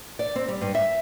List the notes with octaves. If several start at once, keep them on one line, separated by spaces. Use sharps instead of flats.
D5
C4
G3
G2
E5